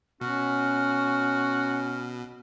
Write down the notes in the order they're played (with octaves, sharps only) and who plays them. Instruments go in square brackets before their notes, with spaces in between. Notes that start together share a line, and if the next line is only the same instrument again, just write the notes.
[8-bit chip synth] B2 [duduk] C#4 [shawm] F#4 [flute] F6